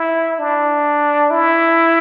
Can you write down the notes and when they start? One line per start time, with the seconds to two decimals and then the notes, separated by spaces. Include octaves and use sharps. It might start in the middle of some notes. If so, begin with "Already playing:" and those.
Already playing: E4
0.39 D4
1.31 E4